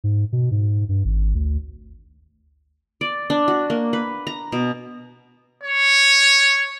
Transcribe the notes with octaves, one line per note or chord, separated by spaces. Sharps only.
G#2
B2
G#2
G2
G#1
D2
D5
D4
F#4
A#3
B4
A#5
B2
C#5